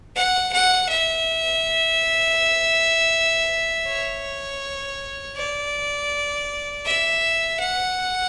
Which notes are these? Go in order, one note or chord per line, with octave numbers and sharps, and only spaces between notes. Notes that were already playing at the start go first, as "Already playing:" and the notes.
F#5
F#5
E5
C#5
D5
E5
F#5